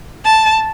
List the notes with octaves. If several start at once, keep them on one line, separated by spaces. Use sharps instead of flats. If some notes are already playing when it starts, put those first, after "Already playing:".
A5